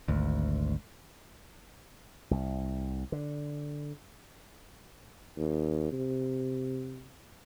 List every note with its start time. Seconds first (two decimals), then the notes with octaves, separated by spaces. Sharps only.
0.08 G#1 D2
2.31 C2
3.12 D3
5.37 D#2
5.92 C3